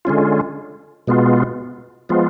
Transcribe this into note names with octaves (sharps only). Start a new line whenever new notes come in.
D3 G#3 C#4 F4
B2 G#3 B3 F4
F3 G#3 B3 F4